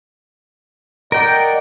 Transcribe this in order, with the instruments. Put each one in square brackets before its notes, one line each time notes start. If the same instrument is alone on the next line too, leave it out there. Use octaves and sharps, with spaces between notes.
[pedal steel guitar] A#4 G5 [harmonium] D5 D#5 F#5